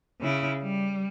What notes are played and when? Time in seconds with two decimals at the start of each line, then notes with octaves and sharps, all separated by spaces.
0.21 C#3 E4
0.62 G3